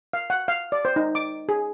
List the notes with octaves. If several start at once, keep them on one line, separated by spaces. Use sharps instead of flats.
F5
F#5
F5
D5
C5
D#4
D6
G#4